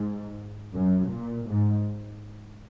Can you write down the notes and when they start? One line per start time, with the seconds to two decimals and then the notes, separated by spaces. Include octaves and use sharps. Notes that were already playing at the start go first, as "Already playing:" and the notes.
Already playing: G#2
0.74 F#2
1.10 A#2
1.48 G#2